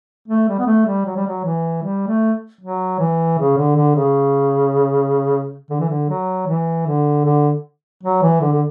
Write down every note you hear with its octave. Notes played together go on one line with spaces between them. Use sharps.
A3
G3
B3
A3
G3
F#3
G3
F#3
E3
G3
A3
F#3
E3
C#3
D3
D3
C#3
D3
E3
D3
F#3
E3
D3
D3
F#3
E3
D3
D3